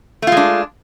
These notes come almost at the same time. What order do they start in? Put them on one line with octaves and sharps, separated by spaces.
A3 F4 G#3 D4